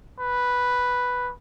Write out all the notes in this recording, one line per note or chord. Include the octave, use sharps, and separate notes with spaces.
B4